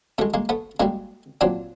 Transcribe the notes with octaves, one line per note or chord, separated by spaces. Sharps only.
B2 G#3 A3
G#3 A#3
A3 B3
B2 G3 G#3 A#3
A#2 F#3 C4 D4